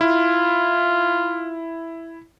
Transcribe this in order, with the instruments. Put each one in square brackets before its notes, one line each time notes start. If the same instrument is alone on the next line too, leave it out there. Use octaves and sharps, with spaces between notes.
[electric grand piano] E4 [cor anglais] F4